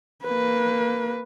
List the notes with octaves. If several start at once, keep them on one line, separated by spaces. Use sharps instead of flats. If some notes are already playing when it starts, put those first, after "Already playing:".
A#3 B4